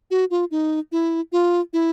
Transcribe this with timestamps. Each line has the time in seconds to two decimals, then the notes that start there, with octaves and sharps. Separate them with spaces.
0.11 F#4
0.31 F4
0.51 D#4
0.92 E4
1.32 F4
1.73 E4